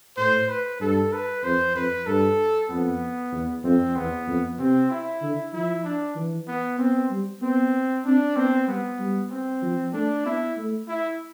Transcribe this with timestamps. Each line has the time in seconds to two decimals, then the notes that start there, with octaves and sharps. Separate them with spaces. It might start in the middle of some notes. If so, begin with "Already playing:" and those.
0.17 A2 C5
0.49 B4
0.81 G2 A4
1.13 B4
1.44 F2 C5
1.75 F2 B4
2.07 G2 A4
2.70 F2 B3
3.32 E2
3.64 F2 C4
3.95 E2 B3
4.27 F2
4.59 C3 C4
4.91 E4
5.22 D3
5.53 F3 E4
5.85 D4
6.16 E3
6.48 B3
6.79 B3 C4
7.10 G3
7.42 B3 C4
8.05 C4 D4
8.36 B3 C4
8.67 G3 B3
9.00 G3
9.31 C4
9.63 F3
9.93 A3 D4
10.25 B3 E4
10.57 A3
10.89 E4